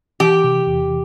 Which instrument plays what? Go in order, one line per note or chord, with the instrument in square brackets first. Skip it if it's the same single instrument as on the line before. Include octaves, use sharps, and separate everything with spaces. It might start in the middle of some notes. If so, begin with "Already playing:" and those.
[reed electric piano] E3 [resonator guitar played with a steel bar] G4
[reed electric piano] C3
E2